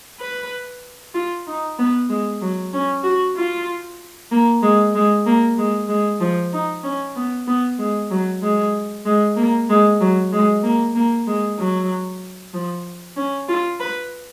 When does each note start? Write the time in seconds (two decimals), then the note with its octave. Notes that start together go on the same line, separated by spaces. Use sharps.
0.20 B4
1.14 F4
1.47 D#4
1.78 B3
2.09 G#3
2.41 F#3
2.73 C#4
3.04 F#4
3.37 F4
4.31 A#3
4.62 G#3
4.95 G#3
5.26 A#3
5.58 G#3
5.89 G#3
6.20 F3
6.52 D#4
6.83 C#4
7.16 B3
7.47 B3
7.78 G#3
8.11 F#3
8.42 G#3
9.05 G#3
9.36 A#3
9.69 G#3
10.00 F#3
10.33 G#3
10.63 A#3
10.95 A#3
11.27 G#3
11.58 F#3
12.54 F3
13.17 C#4
13.49 F4
13.80 B4